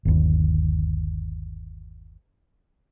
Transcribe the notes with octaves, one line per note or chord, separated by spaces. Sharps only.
G1 D#2